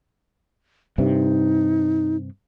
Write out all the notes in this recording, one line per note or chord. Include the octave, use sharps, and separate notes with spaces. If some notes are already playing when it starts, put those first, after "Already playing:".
G2 C3 D#4